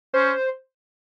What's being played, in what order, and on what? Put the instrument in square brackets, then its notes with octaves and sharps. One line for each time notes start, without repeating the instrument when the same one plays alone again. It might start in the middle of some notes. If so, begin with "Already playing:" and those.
[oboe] C#4 [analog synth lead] C5